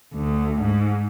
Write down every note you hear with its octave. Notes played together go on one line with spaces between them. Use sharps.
D2
G#2